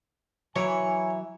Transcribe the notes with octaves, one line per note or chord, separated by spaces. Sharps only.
E3 F#3 E4 C#5 G#5 A#5